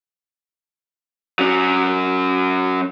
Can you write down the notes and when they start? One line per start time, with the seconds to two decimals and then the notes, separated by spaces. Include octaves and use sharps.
1.39 F#3 C#4